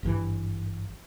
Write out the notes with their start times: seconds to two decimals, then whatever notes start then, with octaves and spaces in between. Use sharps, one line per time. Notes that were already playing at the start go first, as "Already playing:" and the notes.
0.03 G#1 G2 C3 E3